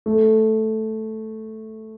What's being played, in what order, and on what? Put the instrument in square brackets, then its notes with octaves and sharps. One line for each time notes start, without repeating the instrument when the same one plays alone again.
[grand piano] A3